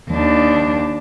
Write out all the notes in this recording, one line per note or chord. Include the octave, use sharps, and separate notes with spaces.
D#2 D4